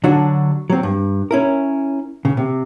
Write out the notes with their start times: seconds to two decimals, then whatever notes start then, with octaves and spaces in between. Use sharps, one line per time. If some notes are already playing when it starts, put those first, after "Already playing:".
0.04 D3 F#3 D4 F#4
0.70 F#3 C4
0.83 G2
1.31 C#4 E4 A#4
2.25 C#3
2.37 C3